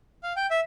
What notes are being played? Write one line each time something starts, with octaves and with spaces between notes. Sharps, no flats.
F5
G5
E5